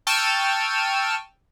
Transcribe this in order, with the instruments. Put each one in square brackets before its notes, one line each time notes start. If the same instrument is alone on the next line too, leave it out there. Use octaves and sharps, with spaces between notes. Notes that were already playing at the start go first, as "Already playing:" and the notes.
[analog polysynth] G5 A5 C#6 E6 F6 D#7